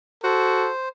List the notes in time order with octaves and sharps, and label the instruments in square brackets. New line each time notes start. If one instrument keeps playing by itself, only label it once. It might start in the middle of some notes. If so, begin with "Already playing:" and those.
[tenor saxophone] F#4 [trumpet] A4 [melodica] C5